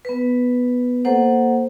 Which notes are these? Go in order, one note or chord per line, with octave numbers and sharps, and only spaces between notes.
B3 B4
A#3 A4 C5 F#5